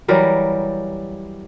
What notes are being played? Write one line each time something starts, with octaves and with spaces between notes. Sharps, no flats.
E3 F#3 G3 A#4